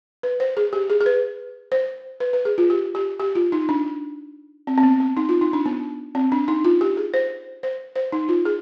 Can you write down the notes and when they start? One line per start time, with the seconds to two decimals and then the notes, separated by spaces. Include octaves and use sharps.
0.23 B4
0.40 C5
0.57 G#4
0.73 G4
0.90 G#4
1.01 G#4
1.06 B4
1.72 C5
2.20 B4
2.33 B4
2.45 G#4
2.58 F4
2.70 G4
2.95 G4
3.19 G4
3.35 F4
3.52 D#4
3.69 D4
4.67 C4
4.78 C4
4.83 B3
5.00 C4
5.17 D#4
5.29 F4
5.41 D#4
5.53 D4
5.66 B3
6.15 C4
6.32 D4
6.48 D#4
6.65 F4
6.81 G4
6.97 G#4
7.14 C5
7.63 C5
7.96 C5
8.12 D#4
8.29 F4
8.45 G#4